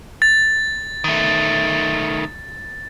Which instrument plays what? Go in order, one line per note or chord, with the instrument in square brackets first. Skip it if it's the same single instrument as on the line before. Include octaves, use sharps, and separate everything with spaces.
[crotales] A6
[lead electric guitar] D#3 A3